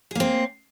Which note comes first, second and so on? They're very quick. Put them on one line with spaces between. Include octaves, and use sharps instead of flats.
G#4 A#3 C4